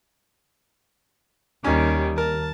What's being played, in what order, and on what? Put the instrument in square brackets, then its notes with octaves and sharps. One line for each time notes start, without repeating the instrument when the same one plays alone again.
[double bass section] D#2 [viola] D#3 G3 [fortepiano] C#4
[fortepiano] A#4 [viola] A5